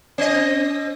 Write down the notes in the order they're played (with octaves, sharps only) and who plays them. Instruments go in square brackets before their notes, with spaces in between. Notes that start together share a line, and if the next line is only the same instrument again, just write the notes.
[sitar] C4 D#5